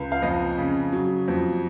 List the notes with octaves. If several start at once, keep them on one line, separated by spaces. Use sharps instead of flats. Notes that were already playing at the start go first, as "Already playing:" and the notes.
Already playing: C#2
F5
F2 D#5
C#3
F#3
F2